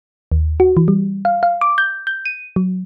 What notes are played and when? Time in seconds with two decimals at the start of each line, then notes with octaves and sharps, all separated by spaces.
0.32 D#2
0.60 F#4
0.77 E3
0.88 G3
1.25 F5
1.43 F5
1.61 D6
1.78 G6
2.07 G6
2.26 D#7
2.56 F#3